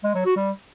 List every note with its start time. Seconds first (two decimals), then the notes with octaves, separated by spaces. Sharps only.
0.04 G#3
0.15 F#3
0.26 F#4
0.37 G3